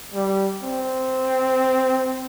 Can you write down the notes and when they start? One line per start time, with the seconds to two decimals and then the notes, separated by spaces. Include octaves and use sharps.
0.14 G3
0.63 C4